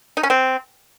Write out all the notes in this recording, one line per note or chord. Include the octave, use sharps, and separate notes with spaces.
D#4
C#4
C4